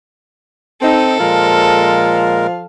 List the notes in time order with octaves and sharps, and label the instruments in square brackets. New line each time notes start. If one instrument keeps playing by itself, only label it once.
[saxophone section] C4 D#4 [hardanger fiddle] A4
[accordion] A#2 G#3 A#4 [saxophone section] F3 F5